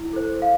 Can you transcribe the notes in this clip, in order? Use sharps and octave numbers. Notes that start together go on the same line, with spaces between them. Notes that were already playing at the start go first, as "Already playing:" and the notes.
Already playing: E4
A4 C5
F5